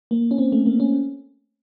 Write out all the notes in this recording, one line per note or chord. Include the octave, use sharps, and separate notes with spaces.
A#3
C#4
C4
A3
A#3
C#4